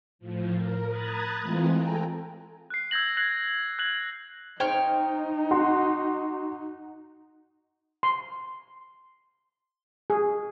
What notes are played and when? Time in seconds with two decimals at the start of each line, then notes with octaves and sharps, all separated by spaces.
0.19 A2 F3
0.54 A#4
0.87 A#5 B5 D#6 F#6 G#6 A6
1.41 E3 G#3 A3 C4 F4
1.74 A4 G5 G#5 A#5
2.70 F#6 C7
2.91 E6 G6 G#6 A#6 F#7
3.17 E6 F#6 G#6 A#6 C7 F#7
3.79 F#6 G#6 A#6 F#7
4.60 D#4 C5 C#5 G5 F6
5.51 F#4 F#5 C6
8.03 C6
10.10 G#4